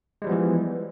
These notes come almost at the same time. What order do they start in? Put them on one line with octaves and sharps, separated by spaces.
G#3 G3 F3 B3 E3